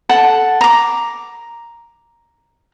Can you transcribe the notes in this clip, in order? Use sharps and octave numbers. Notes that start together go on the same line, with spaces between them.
A4 F#5 A5
A#5 D6